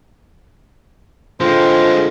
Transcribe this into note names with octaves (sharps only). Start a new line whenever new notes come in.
D3 G#3 C4 F4 C5